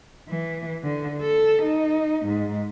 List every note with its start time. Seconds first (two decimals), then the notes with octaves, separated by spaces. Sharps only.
0.29 E3
0.83 D3
1.22 A4
1.63 D#4
2.26 G#2